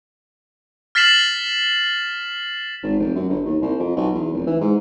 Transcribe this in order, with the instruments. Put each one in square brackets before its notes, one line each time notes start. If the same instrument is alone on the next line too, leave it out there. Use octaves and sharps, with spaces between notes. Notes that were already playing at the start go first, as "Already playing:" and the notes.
[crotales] F6 A6 B6 C7 E7 F#7
[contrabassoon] G#1
F1
F#2
G1
D#2
C2
F2
B1
E2
F1
E3
G#2